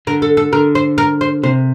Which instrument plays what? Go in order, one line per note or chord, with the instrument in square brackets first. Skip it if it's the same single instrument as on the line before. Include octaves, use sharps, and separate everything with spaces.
[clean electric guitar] D3 [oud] A#4
[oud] A4
A4
[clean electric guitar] D3 [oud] A#4
[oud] C5
A#4
C5
[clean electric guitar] C3 [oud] C5